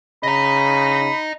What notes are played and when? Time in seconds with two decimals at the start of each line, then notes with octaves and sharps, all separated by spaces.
0.23 C#3 D#5 A#5 B5